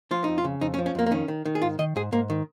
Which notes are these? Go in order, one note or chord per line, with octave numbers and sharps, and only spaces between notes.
F3 F4
F2 D#4
F4
C#3
F2 D#4
C#4
F3
C#4
F2 A#3
A#3
D#3 C#4
D#3
D#3
G#4
G#2 F4
D#3 D#5
G#2 G#4
G#2 A#3
D#3